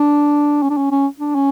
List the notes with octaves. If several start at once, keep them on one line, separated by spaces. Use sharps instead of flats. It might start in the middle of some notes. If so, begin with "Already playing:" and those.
Already playing: D4
C#4
D4
C#4
C#4
D4
C#4